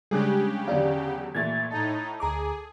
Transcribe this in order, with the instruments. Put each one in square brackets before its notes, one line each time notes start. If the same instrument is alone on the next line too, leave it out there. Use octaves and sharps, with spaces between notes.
[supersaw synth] C#3 G4 [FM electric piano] G3 G#3 D4 [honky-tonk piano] G#4 D6 F#6
[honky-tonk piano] E2 D3 F#3 [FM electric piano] D5 F5
[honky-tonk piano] A#2 E3 A3 [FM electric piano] G#6 A6
[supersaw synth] A2 D#4 [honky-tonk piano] A4
[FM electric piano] D2 A#5 D6 [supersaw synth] G#4